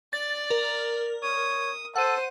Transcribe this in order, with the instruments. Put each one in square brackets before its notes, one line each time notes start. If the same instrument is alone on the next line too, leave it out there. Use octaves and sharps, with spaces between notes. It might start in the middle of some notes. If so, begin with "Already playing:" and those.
[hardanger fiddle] D5 [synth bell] A6
[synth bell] A#4
[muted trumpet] C#5 [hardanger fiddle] D#6
[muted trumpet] A4 [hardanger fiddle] C5 [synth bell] F#5 D#7